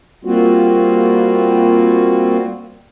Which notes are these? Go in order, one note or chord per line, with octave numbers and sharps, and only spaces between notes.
G3 A#3 C4 F4 F#4